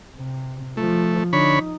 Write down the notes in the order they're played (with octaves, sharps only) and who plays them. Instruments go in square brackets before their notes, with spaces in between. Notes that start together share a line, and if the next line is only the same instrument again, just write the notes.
[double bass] C3
[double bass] F3 [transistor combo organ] A3
[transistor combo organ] D3 C#5 B5 [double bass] D#4